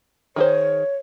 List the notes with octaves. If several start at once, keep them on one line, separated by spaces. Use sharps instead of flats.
D#3 G#4 C5 C#5